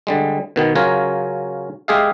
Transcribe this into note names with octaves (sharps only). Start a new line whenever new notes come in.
D3 G3 G#3
B2 D#3 B3
C#3 F#3 C#4 F4 A#4 C#5
G#3 G4 G#4 E5 F5